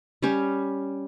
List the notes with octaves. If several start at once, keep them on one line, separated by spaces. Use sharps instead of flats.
G3 C#4 G4